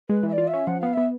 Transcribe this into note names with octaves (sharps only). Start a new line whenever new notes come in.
G#3 B4
E3
E5
D5
F4
E5
C#4
F3 F#5
B3 F5
B3 E5